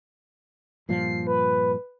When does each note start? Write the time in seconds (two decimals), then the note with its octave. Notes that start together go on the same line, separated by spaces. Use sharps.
0.89 G2 A#2 F3 C7
1.27 B4